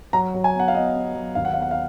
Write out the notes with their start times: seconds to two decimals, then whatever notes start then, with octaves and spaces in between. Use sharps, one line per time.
0.13 F#3 A#5
0.34 F#3
0.44 G#5
0.55 B3 F#5
0.68 F5
0.75 B3 D#5
0.95 B3
1.15 F#3
1.35 D#2 F5
1.45 F#5
1.53 B3 F5
1.62 F#5
1.71 F5